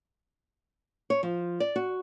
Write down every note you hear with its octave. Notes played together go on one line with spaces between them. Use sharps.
C#5
F3
D5
F#4